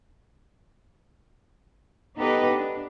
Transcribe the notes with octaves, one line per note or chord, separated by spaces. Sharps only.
B3 D#4 G4 A4 B4 D#5
D4